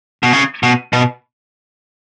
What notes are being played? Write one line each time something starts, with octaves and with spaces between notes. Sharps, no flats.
B2
C#3
B2
B2